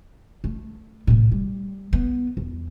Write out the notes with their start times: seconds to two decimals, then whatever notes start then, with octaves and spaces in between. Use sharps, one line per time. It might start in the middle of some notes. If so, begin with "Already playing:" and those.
0.44 A3
1.07 C2 A2
1.32 G3
1.93 B3
2.37 E2